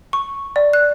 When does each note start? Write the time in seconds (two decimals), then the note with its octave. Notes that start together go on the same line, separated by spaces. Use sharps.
0.13 C#6
0.56 D5
0.73 F#6